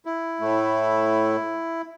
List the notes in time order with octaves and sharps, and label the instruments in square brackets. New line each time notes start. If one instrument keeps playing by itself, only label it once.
[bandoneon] E4
[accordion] A2 A3